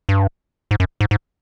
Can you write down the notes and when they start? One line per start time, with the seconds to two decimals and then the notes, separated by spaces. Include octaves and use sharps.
0.09 G2
0.71 G#2
0.80 F#2
1.01 G#2
1.11 G#2